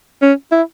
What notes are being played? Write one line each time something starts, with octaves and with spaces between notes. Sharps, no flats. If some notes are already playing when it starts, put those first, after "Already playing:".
C#4
E4